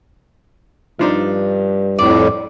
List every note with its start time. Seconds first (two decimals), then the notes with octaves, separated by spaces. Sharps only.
0.99 G2 F3 D4 D#4
1.99 F2 A2 D5